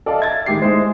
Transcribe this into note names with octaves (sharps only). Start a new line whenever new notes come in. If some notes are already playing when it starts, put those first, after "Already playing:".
A4 D5 D#5 F5 A5
E5 G#6 A6
D#3 G#3 G4 C7
G#3 E4 C5